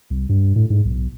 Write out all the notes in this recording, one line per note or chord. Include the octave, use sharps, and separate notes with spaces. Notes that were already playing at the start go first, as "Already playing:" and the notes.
C2
G2
A2
G#2
B1